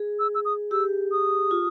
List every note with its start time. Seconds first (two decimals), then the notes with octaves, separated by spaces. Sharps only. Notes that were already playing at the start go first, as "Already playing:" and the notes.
Already playing: G#4
0.19 E6
0.35 E6
0.45 D#6
0.71 G4 E6
1.12 D#6
1.51 F4